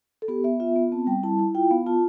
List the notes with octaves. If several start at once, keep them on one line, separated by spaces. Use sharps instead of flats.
A4
B3 G4
B3 E5
F4 E5
B3
C4 A5
G3 G5
E4 A5
E4
F4 G5
B3 F5
F4 A5